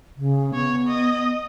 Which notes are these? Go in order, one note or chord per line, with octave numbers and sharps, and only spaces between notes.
C#3
B3 C#5
D#5